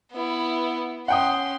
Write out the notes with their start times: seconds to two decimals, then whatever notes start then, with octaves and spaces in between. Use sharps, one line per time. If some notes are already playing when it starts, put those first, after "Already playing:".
0.12 B3 E4
1.08 C#4 F#5 G5 C6 D#6